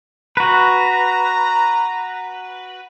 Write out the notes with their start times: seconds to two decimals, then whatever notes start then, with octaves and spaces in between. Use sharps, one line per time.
0.37 F#4 B4 A#5